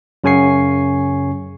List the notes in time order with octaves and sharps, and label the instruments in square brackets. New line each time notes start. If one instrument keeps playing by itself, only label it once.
[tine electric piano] F#2 C#3 C#4 G#5 C#6 C7